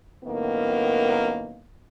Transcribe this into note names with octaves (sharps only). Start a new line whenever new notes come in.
F#2 A2 D#3 A#3 B3